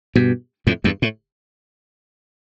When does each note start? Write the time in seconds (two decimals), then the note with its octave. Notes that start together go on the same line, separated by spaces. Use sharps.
0.16 G2 B2
0.67 F2 A2
0.84 E2 G2
1.02 A2